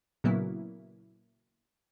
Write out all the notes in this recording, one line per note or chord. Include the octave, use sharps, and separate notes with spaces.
A#2 C#3 F#3 A#3 B3 E4